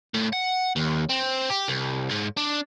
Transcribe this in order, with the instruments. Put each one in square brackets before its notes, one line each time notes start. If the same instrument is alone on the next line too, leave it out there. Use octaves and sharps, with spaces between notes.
[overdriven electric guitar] A2
F#5
D#2
C4
G4
C2
G#2
D4